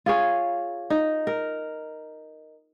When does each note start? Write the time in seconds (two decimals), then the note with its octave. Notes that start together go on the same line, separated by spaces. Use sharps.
0.06 F4 G#4 C#5
0.90 D#4
1.27 A#4